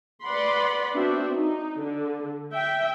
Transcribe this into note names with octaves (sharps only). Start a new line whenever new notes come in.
B4 D5 F#5 B5 C6
B3 C4 D4 F#4 E5
D#4
D3
E5 G5